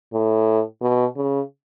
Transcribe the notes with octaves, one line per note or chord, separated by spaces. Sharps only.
A2
B2
C#3